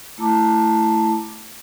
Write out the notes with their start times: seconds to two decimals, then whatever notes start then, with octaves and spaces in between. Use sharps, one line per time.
0.18 A3 E4 A5 A#5 D6